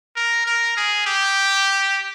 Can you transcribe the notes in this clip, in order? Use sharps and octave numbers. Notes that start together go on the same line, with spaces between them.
A#4
A#4
G#4
G4